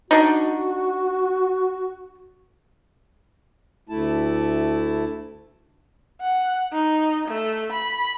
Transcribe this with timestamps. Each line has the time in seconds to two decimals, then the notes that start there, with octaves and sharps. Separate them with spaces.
0.11 D4 D#4 F#4
3.89 D2 A3 E4 A5
6.21 F#5
6.73 D#4
7.28 A3
7.72 B5